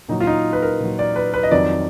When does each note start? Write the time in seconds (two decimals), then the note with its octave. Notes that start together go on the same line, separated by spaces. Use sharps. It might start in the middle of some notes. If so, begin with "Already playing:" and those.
0.09 A#2 F#3 D#4
0.20 F4
0.27 D#4
0.53 B4
0.62 A#4
0.80 A#2 F#3
0.99 D5
1.16 B4
1.34 B4
1.43 D#5
1.51 F2 D#3 F#3 D5